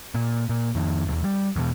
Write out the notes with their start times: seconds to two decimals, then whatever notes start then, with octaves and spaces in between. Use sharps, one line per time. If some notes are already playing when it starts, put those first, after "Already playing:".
0.15 A#2
0.49 A#2
0.75 F2 D#3
1.07 D#1 A1 E2
1.24 G3
1.56 E2 B2